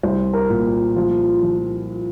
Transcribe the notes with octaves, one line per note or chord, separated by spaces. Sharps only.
C2 C5
A#4
A#2
F3 F4
F3